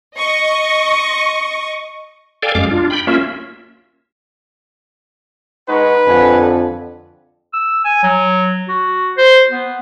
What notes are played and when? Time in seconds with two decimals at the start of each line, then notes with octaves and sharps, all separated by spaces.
0.17 D#5 C#6
2.43 A4 D5 F5 G5 G#5
2.55 F#2 G#3 F5 D6
2.71 D4 F4
2.90 G5 B5
3.07 A#3 C#4 F4 E5
5.69 G#3 D#4 B4 F#5 C#6
6.07 F2 D3 F#5 G#5
7.53 E6
7.84 G#5
8.03 F#3
8.69 F#4
9.17 C5
9.51 B3